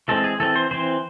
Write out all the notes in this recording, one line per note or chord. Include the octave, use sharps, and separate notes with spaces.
E3 G#3 C4 A4
G#4
E3 C4 A4
C5
E3 C4 C5